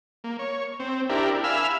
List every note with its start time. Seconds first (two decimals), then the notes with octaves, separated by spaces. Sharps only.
0.24 A#3
0.39 C#5
0.80 C4
1.10 D4 E4 G4 A#4
1.44 E5 F5 G#5 B5 E6 F6